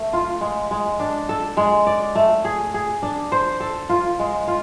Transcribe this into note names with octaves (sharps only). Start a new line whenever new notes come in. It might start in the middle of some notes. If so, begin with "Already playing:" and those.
Already playing: A3
F4
G#3
G#3
D4
A4
G#3
D5
A3
G#4
G#4
D4
C5
A4
F4
G#3
F4